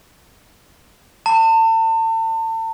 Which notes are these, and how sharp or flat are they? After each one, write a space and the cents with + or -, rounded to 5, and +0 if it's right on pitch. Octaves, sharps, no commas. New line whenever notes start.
A5 +35